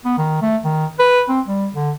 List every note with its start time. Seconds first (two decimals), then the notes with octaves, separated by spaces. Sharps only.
0.05 B3
0.18 D#3
0.42 A3
0.65 D#3
0.99 B4
1.29 C4
1.48 G3
1.74 D3